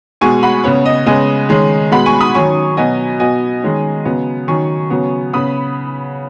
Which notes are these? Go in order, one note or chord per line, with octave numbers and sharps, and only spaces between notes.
B2 G#3 B3 G#5 C#6
F#5 B5
C#3 B3 C#5
D#5
C#3 G#3 B3 D#5 G#5
D#3 G#3 C#4
B2 G#3 B3 F#5 B5
G#5 C#6
B5 D#6
D#3 F#3 C#4 G#5 C#6
B2 F#3 B3 D#5 G#5
B2 B3 D#5 G#5
D#3 G#3 C#4
C#3 F#3 B3
D#3 F#3 C#4 G#5 C#6
C#3 F#3 B3
C#3 B3 B5 D#6